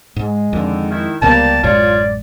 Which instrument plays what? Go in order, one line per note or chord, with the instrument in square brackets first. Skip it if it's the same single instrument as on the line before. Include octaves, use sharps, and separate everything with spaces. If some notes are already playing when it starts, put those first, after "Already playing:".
[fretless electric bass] G#2 [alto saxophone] G#3
[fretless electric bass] F2 [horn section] D3 D#3
[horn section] D#3 E4
[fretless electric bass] C#2 C3 B3 [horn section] G3 A#3 [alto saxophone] A5
[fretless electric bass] A1 F#2 G#3 [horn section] F4 C#5 [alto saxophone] D5